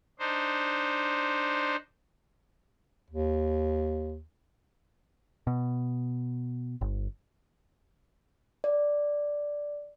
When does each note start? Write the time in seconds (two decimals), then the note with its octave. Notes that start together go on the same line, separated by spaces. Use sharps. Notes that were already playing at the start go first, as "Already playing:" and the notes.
0.19 D4 D#4 C5
3.10 D#2
5.47 B2
6.81 G1
8.64 D5